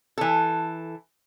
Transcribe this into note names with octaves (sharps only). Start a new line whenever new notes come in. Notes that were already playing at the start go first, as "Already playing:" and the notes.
E3 A4